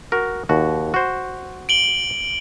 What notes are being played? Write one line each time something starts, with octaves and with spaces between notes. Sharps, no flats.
F#4 A#4
D#2 F#4
F#4 C5
D7 F#7 G7